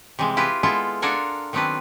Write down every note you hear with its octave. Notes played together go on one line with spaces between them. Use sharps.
C3 E3 G3 G#3
E4 F4 G4 B4
G#3 B3 E4 F4 A4
D4 F4 A4 A#4 F#5 G#5
D#3 F#3 B3 C4 D4 B4